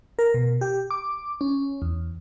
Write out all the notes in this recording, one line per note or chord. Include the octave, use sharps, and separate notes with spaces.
A#4
B2
G4
D6
C#4
E2